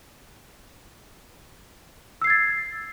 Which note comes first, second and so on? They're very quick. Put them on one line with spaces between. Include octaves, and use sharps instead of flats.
E6 C7 G#6 A6